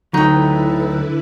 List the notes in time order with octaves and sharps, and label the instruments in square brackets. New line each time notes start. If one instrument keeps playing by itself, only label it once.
[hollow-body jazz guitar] D2 F#3 [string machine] D3 E4 B4 [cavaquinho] D#4 G5 [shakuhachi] A4